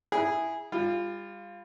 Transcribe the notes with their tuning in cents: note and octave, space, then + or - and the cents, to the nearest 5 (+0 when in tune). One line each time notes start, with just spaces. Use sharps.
E4 +0 G#4 -10 B5 -45
G3 +30 F4 +0